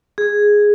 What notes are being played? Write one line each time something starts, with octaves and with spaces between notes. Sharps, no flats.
G#4